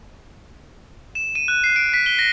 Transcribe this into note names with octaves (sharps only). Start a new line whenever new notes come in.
E7
D#7
F#6
C7
D7
B6
G7
A#6